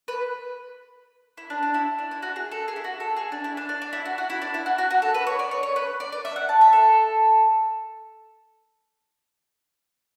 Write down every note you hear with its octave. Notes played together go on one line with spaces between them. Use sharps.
B4
E4
D4
D4
E4
D4
E4
F#4
G#4
A4
G#4
E4
F#4
A4
G#4
D4
E4
D4
D4
D4
E4
F#4
F#4
E4
D4
E4
F#4
F#4
F#4
A4
B4
C#5
D5
C#5
C#5
B4
D5
D5
E5
F#5
A5
E5
A4